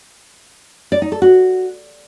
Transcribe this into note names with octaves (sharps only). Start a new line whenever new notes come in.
D5
D#4
A4
F#4